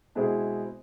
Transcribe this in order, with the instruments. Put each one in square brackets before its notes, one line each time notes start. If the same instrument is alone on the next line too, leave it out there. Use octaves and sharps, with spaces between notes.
[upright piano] B2 G#3 C4 E4 G#4